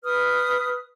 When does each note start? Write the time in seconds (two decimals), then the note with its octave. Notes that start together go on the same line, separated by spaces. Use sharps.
0.03 B4 D#6 F6